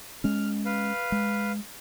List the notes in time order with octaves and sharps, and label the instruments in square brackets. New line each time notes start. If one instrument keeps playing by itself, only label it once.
[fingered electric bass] G#3 C#4 [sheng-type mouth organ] F6
[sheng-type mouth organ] B4 F5
[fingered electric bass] G#3